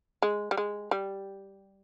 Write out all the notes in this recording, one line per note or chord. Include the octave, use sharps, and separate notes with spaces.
G#3
G3
G#3
G3